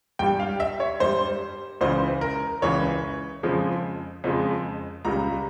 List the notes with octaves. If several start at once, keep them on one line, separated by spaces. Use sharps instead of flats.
G2 G3 G5
F5
E5
C#5
G2 G3 C5
C#2 C#3 E3 C5
A#4
C#2 C#3 E3 C#5
F2 C#3 F3 G#3
F2 C#3 F3 G#3
C#2 C#3 G3 A#5